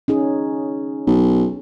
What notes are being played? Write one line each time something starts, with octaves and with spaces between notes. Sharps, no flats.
C#4 D#4 G#4
B1